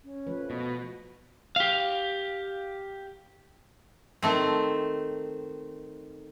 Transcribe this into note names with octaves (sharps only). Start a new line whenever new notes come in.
C#4
F3 A3 B4
B2 F#4
G4 F5
D#3 A3 C4